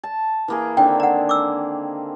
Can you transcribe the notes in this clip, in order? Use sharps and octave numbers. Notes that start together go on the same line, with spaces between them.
A5
E3 A#3 G#4
D3 D#3 C4 G5
F#5 A#5
D6 E6